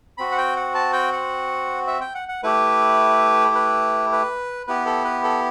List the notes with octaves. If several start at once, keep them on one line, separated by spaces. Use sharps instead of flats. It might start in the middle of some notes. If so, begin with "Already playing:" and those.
C4 F#4 B5
F#5
G5
F#5
A5
G5
F#5
E5
G5
F#5
F#5
A3 E4 G4 B4
B4
B4
B3 E4 G4 B4
A4
B4
A4